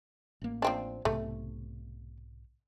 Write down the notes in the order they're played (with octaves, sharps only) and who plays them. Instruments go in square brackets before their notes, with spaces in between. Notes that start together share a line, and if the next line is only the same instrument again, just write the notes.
[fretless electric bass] A1 A#3
[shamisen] F3 C4 D4
[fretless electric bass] B1 G#2 C3 [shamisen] A3